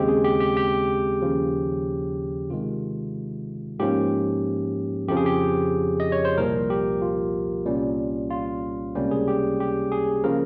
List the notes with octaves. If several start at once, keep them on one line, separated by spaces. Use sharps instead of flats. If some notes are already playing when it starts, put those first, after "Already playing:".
Already playing: D#2 C#3 G#3 C4 G4
G#4
G4
G4
G4
D#2 C#3 F3
C3 D#3 G#3 F4
G#2 F3 A#3 C#4 G4
F2 C#3 F3 G4
G#4
G4
D#5
C#5
C5
C2 A#2 F3 A#4
G4
F4
C2 A#2 G3 C#4
F4
C#2 C3 G3 A#3 C#4 G4
G#4
G4
G4
G#4
C#3 F3 A#3 A#4